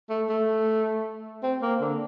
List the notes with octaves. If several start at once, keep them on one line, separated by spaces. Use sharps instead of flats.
A3
A3
C4
A#3
D3